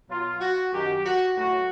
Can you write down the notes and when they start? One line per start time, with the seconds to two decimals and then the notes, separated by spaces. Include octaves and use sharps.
0.09 B2 F#3 F4
0.40 F#4
0.72 F#2 D#3 F#3 G4
1.04 F#4
1.36 A2 F#3 F#4